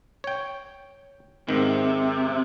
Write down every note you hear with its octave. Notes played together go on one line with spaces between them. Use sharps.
C#5 G5
G#2 C3 D#3